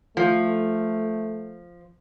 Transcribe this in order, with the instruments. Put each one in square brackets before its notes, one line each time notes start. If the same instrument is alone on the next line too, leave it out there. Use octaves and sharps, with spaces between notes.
[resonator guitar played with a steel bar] F3 [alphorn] A3